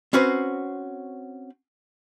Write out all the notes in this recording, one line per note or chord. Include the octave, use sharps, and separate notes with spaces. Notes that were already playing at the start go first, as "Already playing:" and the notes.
C4 C#4 F#4 B4 C5